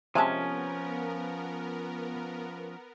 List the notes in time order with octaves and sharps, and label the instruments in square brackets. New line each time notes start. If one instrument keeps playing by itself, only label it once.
[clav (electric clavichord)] C3 G#3 [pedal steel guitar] F3 C#4 [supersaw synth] B3 A#4 [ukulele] G#5 A5